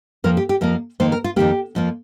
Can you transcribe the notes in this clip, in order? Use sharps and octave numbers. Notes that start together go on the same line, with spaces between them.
F2 F3 A#3 A#4
G4
G4
F2 F3 A#3 A#4
F2 D#3 A#3 C5
A#4
F4
F2 D#3 A#3 G4
F2 F3 A#3